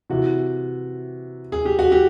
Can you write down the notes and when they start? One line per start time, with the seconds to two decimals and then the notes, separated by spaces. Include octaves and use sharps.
0.10 C3 E3 F#4
1.52 G#4
1.65 G4
1.79 F#4
1.92 G4